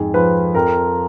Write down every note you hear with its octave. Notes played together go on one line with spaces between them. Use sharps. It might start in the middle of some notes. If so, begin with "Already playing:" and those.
Already playing: F2 G#2 G#4
F3 B4
F2 A#4